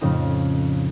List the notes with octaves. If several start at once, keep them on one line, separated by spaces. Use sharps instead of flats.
F2 A2 C#3 C4 D#4